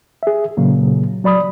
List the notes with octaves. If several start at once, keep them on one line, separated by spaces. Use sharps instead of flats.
G#4 E5
A#2 C#3 F#3 A#3
F#3 D5 B5 D#6